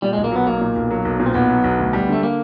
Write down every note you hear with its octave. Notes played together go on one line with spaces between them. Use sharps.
A#2 G3
B1 G#3
A#3
F#3 B3
B1 A#3
A#2
B1
F#3
B1
A#2
C4
B1 B3
F#3
B1
D2
G3
D3 A3
A#3